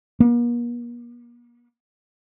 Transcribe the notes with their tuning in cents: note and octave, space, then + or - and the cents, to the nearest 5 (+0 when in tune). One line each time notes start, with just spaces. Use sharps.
A#3 +45